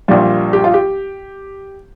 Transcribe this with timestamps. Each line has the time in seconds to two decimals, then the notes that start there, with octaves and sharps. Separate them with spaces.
0.08 A#1 A#2 G3 F4
0.53 G4
0.64 F4
0.74 G4